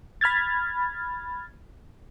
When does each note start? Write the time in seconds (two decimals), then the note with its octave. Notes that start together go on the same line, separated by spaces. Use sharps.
0.21 B5 F6 G#6 A6